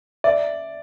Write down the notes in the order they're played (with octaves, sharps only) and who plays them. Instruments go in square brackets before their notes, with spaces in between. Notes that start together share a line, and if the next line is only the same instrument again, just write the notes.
[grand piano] D5 [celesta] E5